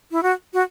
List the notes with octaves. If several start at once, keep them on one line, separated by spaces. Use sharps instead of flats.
E4
F#4
F#4